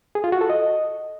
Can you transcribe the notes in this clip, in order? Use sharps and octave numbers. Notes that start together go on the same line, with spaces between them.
G#4
F4
F#4
A4
D#5